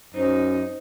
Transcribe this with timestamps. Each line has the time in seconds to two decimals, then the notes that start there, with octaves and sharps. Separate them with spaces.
0.14 F#2 D#4 C5